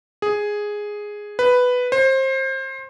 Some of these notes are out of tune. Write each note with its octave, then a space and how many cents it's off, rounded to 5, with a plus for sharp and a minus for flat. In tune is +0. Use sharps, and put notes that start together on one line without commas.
G#4 +0
B4 +5
C5 +25